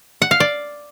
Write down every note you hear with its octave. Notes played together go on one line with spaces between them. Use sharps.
F#5
F5
D5